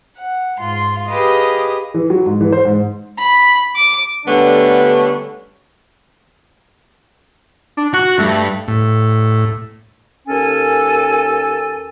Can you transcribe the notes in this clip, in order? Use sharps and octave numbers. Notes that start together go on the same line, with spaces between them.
F#5
G#2 F4 C6
G4 G#4 B4 D#5 F5 D#6
E3
F#3
G#2
E3
C5
G#2
B5
D6
D3 G3 A3 B3 C#4 D4
D4
F#4 F#6
G2 A3
A2
D#2 C#4 A4 G#5